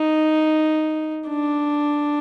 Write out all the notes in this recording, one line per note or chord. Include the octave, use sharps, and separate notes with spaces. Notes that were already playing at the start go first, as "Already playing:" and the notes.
Already playing: D#4
D4